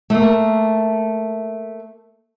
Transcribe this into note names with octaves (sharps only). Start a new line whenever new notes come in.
A3 A#3